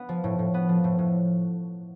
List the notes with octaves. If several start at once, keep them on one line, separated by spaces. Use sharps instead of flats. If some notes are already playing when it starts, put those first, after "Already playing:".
Already playing: B3
F3
A2
A2
B3
F3
A2
A2